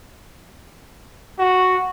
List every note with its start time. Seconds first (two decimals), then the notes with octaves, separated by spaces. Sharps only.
1.39 F#4